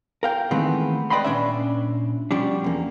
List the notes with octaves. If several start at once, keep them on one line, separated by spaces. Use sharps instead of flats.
A#4 F5 G5
D#3 E3 G#3 A3 B3 C4
B4 D5 D#5 G5 B5 C6
A#2 G#3 C#4 D4 D5 E5
B2 F3 G3 C#4 D4
E2 A#3